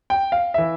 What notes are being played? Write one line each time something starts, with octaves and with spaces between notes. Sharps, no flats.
G5
F5
E3 E5